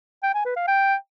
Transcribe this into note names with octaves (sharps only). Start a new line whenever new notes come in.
G5
G#5
B4
F5
G5